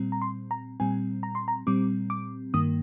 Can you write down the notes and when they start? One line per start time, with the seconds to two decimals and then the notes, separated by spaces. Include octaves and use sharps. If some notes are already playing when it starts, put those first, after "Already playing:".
Already playing: A#2 G3 C4
0.12 A#5
0.22 C6
0.51 A#5
0.80 A#2 G3 C4 G#5
1.23 A#5
1.35 C6
1.48 A#5
1.67 A#2 G3 C4 D6
2.10 D6
2.54 G2 D#3 A#3 D#6